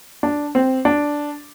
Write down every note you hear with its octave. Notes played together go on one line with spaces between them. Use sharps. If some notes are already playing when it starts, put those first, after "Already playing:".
D4
C4
D4